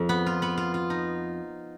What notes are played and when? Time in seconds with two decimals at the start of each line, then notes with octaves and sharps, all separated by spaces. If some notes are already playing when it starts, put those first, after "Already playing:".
Already playing: F2
0.09 B3
0.26 F4
0.42 B3
0.58 F4
0.74 F4
0.90 D#4